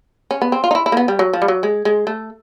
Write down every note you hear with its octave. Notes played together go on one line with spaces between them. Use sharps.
C#4
B3
C4
F4
D#4
E4
E4
A#3
B3
G3
F#3
F3
G3
F#3
G#3
G#3
A3